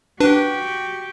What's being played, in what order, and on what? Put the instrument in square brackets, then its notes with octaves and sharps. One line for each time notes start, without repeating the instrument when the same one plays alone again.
[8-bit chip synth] D4 B4 [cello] F#4 G4